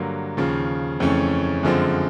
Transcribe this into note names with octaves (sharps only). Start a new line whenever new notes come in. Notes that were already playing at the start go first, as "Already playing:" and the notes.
Already playing: G2 D3 F#3 A#3
D#2 C#3 F3
F2 C#3 E3 A3 C#4
F#2 D3 F3 G#3 C4